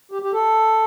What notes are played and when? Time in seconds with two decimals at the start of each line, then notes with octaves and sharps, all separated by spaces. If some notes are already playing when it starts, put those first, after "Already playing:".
0.12 G4
0.22 G4
0.33 A4